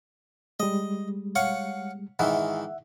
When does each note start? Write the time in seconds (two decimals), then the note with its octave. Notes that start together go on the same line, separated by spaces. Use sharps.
0.60 G3 G#3 D#5
1.35 C#5 F5 F#5
2.19 G#2 D#3 E3 E5 F#5